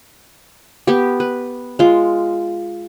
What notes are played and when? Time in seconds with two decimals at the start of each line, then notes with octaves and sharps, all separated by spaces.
0.87 B3 G4
1.20 B4
1.79 G#3 F4